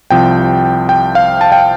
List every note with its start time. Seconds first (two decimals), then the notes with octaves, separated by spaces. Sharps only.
0.11 C2 C3 F3 G5
0.89 G5
1.15 F5
1.41 A5
1.52 G5